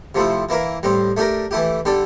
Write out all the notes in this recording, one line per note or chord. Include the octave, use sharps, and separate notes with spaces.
C3 F3 A3 E4
E3 A#3 E4 A#4
A2 G3 C4
A3 D4 G4 A#4
E3 A3 E4 G4
D3 G3 D4 A4